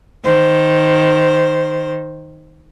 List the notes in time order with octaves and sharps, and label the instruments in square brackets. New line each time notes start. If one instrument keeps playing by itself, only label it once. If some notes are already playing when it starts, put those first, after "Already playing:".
[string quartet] D#3 C5